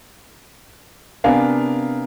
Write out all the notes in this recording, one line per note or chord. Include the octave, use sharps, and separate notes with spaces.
C3 B3 D4 A#4 F5 G#5